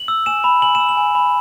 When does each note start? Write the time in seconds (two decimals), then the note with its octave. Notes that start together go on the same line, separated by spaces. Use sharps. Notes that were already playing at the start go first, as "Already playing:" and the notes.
Already playing: F#7
0.08 E6
0.26 G#5 E7
0.44 B5
0.62 G#5 F#7
0.75 E7
0.80 E6
0.89 F#7
0.97 G#5
1.15 B5